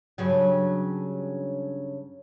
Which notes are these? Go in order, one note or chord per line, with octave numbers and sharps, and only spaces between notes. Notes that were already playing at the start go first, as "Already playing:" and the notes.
G2 C#3 F#3